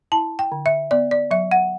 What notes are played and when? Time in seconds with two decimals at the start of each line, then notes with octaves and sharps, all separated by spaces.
0.12 E4 A5
0.39 G5
0.52 D3
0.66 E5
0.91 B3 D5
1.11 D5
1.31 F#3 E5
1.51 F#5